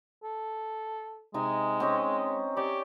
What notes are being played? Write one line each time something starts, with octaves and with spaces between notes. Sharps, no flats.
A4
C3 G#3 D#4 G#5
C4 C#4 D#5
G4 C#5 D5